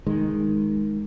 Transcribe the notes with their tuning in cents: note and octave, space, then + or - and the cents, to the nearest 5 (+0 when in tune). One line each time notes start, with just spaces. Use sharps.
D#3 +0 G#3 +0